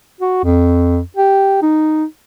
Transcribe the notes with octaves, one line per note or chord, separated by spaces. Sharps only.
F#4
F2
G4
D#4